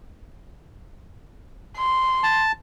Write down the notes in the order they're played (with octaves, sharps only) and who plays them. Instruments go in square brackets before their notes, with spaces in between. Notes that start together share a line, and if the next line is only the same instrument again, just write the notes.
[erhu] C6
[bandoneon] A5